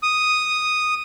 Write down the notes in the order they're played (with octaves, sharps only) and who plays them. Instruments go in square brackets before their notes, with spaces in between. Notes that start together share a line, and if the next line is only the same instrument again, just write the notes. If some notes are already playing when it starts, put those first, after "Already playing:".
[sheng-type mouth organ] D#6